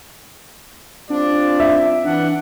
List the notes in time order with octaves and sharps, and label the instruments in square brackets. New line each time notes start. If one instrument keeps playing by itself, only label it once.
[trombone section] G3 C4 F4 [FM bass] D4 [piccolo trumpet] D5
[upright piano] E5
[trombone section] E3 [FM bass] D4 [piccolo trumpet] F#5